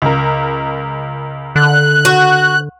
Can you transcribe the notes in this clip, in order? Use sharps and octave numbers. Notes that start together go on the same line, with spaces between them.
C#2 A#4
D3 F#6
F#4